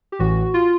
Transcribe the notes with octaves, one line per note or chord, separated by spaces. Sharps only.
G4
A1 A2 E3 F#4
F4